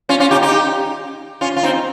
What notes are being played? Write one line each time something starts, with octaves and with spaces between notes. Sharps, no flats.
C#4 F4
C#4 F4
D#4 G4
D#4 G4
C#4 F4
F4
C4 D#4